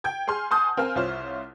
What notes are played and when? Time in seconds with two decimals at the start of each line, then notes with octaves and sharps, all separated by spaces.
0.04 G5 G6 G#6
0.28 G#4 G#5 C6 F6
0.51 F#5 G#5 A5 C6 D#6 G6
0.77 C4 A#4 F5 G#5 F6
0.95 C2 F4 C5 C#5 F6